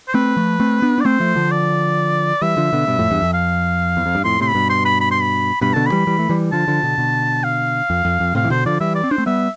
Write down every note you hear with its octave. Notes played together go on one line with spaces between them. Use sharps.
C5
A3 C4 B4
F3 A3
A3 C4
B3 D4
D4 D5
A3 C4 C5
F3 A3
D3 F3
D5
E3 G3 E5
D3 F3
B2 D3
G2 B2
F2 A2
E2 G2
F2
F5
E2
F2
G2
F2 A2 C6
A2 C3 C6
B5
G2 B2
C6
B5
B5
C6
B5
G2 B2 B5
B2 D3 A5
B5
E3 G3
E3 G3
A3
E3 G3
D3 F3 A5
D3 F3
B2 D3
B2 D3
F5
F2
F2
F2
A2 C3 F5
E3
B2 D3 C5
D3 F3 D5
E3 G3 E5
D5
C4
D4 C5
A3 C4
G3 B3 E5